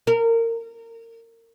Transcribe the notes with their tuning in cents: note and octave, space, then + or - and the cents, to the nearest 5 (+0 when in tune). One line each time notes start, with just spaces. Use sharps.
A#4 -25